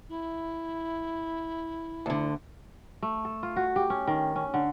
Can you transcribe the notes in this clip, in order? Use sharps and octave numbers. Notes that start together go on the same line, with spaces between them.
E4
D2 D3
A3
A4
F4
F#4
G4
C#4
D#3
C#4
D3